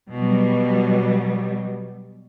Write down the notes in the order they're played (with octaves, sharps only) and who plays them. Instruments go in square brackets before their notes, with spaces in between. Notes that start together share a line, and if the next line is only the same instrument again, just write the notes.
[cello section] B2 F#3 G3